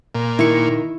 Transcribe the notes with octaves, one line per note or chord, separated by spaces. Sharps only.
A#2
D#3 E4 C#6